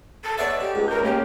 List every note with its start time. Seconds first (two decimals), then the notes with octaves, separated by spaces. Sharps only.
0.23 A4
0.38 G#3 B4 C#5 D5 E5 F#5 C#6
0.60 D3 G4
0.75 C#2 G#2
0.88 A#4 G6
1.03 A#3 C#4 G4